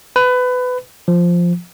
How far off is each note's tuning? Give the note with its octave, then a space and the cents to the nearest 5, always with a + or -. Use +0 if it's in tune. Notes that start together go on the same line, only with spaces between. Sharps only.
B4 +20
F3 +0